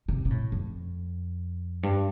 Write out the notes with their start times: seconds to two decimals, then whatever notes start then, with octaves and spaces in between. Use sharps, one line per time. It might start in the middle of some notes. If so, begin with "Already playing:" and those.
0.08 C3
0.25 C3
0.31 A2
0.52 F2
1.83 G2